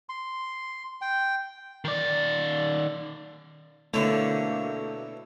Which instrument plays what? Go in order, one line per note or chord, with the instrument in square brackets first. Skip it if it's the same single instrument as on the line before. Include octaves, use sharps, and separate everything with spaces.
[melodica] C6
G5
[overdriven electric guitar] D#3 D5
[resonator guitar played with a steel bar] B2 D3 [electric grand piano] A3 [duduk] A#3 [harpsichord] E4 C#5 E5